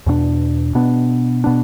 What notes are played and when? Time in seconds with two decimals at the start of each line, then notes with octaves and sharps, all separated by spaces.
0.06 E2 B2 A3 D4
0.75 B2 B3 D4
1.44 B2 B3 D4